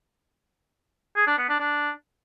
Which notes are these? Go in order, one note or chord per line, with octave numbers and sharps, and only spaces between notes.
G#4
D4
B3
D4
D4